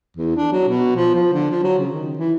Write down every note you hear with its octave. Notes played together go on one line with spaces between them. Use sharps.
E2
D4
F#3
B2
F3
F3
D3
F3
F#3
C#3
D#3
E3